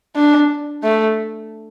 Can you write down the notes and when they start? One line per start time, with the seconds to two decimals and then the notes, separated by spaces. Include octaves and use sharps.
0.16 D4
0.83 A3